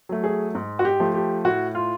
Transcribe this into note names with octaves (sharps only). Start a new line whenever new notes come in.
F#3 A3
G#4
G#2
F#4
G4
F3 A3
G4
A2 F#4
F4